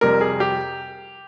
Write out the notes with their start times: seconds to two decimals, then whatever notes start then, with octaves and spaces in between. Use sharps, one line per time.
0.01 F2 C3 G3 A#4
0.21 G#4
0.40 G4